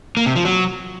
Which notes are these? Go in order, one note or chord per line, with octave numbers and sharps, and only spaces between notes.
A#3
C3
F3
F#3